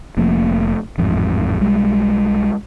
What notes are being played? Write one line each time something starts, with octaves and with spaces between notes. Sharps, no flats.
F1 F3 A3 A#3
A1 F2 G#2
B1 G3 G#3